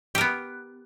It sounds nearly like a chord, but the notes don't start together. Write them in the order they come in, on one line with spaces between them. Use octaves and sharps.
G4 A#4 B3